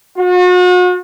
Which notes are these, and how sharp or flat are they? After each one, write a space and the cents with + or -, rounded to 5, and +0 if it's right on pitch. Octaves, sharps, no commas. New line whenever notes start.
F#4 -40